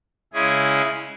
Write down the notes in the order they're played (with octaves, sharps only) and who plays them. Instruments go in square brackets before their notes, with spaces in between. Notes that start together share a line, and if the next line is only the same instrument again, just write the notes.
[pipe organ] C#3 G#3 C#4 E4 G#4